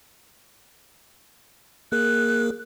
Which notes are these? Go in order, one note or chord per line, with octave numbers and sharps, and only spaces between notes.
A#3 G#4 A#4 F#6